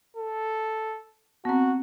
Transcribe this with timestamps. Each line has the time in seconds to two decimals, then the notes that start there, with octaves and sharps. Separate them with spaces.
0.17 A4
1.45 B3 C4 F#4